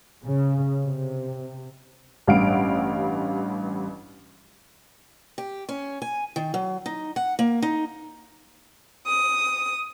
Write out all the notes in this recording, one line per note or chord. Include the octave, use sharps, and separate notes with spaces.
C#3
C3
A1 G2 F5 F#5 D7
G4
C#4
G#5
D#3
F#3
D#4
F#5
A#3
D#4
D#6